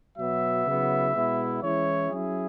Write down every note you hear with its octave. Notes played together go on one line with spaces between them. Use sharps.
B2 F#3 B3 E5
C#3 F#3 B3 E4
B2 G#3 B3 E4
E3 G#3 C#4 E4 C#5
F#3 C#4 E4 G#4